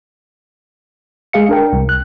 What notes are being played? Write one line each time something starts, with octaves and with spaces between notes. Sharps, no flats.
G#3 G#4 F5 C#7
D4 A#4 G5
C2
F#6